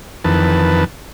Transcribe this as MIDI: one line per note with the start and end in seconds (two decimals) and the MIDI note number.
0.24 0.84 41
0.24 0.84 51
0.24 0.84 52
0.24 0.84 71
0.24 0.84 81